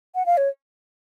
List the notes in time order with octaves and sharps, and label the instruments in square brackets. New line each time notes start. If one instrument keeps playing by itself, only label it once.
[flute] F#5
F5
C#5